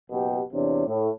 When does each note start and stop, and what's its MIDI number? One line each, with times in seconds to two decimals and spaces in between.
0.10 0.39 30
0.10 0.39 47
0.10 0.39 67
0.53 0.84 40
0.53 0.84 48
0.53 0.84 62
0.53 0.84 73
0.87 1.08 45